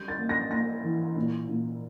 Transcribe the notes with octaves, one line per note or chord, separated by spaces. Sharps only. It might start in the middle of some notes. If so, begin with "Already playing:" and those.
Already playing: G3 G6
A6
A#3
A#6
A#3 A#6
E3
A#2
A#2